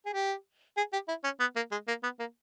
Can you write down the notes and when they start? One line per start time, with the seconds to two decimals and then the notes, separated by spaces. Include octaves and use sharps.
0.06 G#4
0.13 G4
0.77 G#4
0.93 G4
1.08 E4
1.24 C#4
1.40 B3
1.56 A#3
1.72 G#3
1.88 A#3
2.03 B3
2.20 A#3